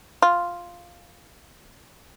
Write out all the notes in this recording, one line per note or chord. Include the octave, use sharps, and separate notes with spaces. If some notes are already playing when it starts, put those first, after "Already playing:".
F4